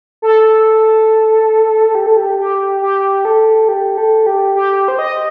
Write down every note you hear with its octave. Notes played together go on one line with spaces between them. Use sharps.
A4
G4
A4
G4
G4
G4
A4
G4
A4
G4
G4
C5
D#5